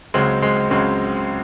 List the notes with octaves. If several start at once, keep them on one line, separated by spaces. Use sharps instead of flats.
C#2 C#3 F#3 G#3 C4
G#3 C4
C#2 C#3 F#3 G#3 C4